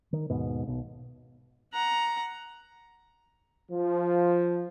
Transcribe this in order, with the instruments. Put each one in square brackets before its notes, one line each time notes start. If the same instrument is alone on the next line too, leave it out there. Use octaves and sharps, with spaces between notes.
[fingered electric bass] D#3
D#2 G#2 B2
B1 B2
[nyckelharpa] F#5 A#5
[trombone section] F3